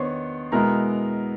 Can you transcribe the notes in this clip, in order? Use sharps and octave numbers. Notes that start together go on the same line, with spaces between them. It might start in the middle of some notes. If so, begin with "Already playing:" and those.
Already playing: D#3 B3 D4 C5 C#5 C6 C#6
B2 G#3 B3 E4 A#4 A#5